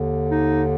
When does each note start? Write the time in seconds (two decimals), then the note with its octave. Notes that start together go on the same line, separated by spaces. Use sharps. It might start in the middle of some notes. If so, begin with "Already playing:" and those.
Already playing: D#2 D3
0.30 D#4